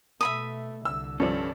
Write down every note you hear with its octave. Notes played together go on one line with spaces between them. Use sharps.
B2 A3 E5 B5 D#6
C2 D3 E6
G2 F3 C#4 A4 D5